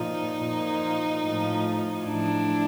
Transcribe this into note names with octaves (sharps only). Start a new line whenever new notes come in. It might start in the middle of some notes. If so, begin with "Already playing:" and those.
Already playing: A#2 F3 D#4
A#2 F3
A2 F3
A2 F3 D4 E4